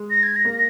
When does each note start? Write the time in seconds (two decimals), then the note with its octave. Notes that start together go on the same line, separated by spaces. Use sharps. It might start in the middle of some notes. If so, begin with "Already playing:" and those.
Already playing: G#3
0.10 A#6
0.23 G#6
0.36 A#6
0.45 A#3